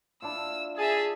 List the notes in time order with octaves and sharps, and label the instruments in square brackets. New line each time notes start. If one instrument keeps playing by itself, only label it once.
[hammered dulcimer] D4 E4 F4 [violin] E6
[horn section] G#4 [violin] E5 A5